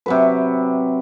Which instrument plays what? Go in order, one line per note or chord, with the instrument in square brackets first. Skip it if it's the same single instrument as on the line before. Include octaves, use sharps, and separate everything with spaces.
[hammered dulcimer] C3 F#3 B4